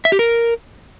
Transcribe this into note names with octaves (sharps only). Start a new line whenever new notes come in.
E5
G4
A#4